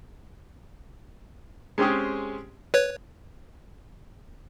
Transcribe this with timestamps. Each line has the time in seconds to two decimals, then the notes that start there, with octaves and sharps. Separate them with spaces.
1.78 G#3 C4 C#4 G4 G#4
2.74 B4 C#5